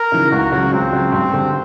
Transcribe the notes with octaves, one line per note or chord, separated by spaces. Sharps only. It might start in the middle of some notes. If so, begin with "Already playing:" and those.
Already playing: A#4
C#3 E3
C#2 F#4
C#3 F#3
C#2 C4
C#3 F#3
G2 C4
D3 G3